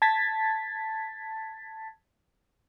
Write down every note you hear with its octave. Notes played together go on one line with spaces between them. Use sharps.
A5 G#6 A6 B6